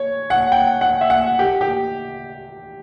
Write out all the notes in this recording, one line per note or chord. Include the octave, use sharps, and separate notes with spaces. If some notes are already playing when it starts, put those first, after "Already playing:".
Already playing: C#5
F#5
G5
F#5
E5
F#5
G4
G4